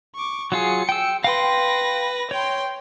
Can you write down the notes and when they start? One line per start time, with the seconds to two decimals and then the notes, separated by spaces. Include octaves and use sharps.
0.15 C#6 D6
0.52 F#3 F4 G#4 C#7
0.89 G5 E6
1.24 B4 F5 G5 C6 A#6
2.31 C#5 G5 C6